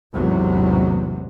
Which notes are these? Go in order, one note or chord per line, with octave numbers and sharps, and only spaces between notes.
A1 E2 G#2 C3 F#3